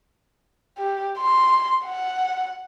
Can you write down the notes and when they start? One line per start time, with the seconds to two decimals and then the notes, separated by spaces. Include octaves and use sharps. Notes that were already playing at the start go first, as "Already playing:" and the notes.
0.78 G4
1.18 C6
1.86 F#5